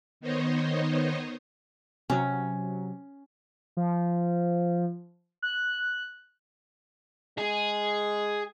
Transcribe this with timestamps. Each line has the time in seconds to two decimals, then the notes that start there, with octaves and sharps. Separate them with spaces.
0.21 D#3 B3 D#4 C5 C#5 D#5
2.10 C3 F#3 C#4
3.77 F3
5.42 F#6
7.38 G#3 G#4